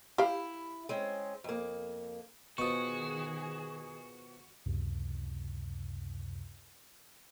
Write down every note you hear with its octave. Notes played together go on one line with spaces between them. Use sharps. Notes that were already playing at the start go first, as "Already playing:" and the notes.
E4 G4 F5
G#3 C4 C#4
F2 A#3
B2 D#3 F3 F#4 G#4 C#6 D#6
C#2 F#2 C3